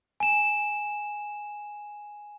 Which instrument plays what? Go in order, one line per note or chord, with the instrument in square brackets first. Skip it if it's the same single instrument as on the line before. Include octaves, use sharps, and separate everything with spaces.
[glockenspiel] G#5 E7